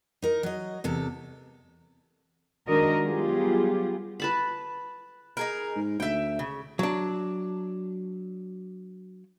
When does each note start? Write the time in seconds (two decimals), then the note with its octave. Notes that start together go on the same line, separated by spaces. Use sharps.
0.22 D#4 A#4
0.43 F#3 D#5
0.84 E2 C3 A4
2.67 D#3 G#3 D4 F#4 A#4 D#5
3.01 F#3 G3 B3 F4 G4 G#4
4.20 B4 A5 B5
5.37 D#4 G#4 A#4
5.76 G#2
6.00 D2 E5 G5
6.39 C#3
6.79 F#3 D4